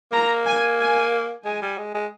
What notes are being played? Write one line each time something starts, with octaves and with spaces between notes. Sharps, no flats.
A#3 A#5
G#5
G#5
G#3 G#5
G3
G#3
G#3